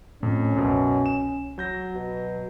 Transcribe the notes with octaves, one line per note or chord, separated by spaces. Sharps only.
F2 A2 C#4
C2 F#2 B2
E7
F#3 G6 A#6
B2